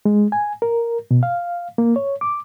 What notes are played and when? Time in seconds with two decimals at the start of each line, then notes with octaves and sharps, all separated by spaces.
0.05 G#3
0.32 G#5
0.62 A#4
1.11 B2
1.23 F5
1.78 A#3
1.96 C#5
2.21 D6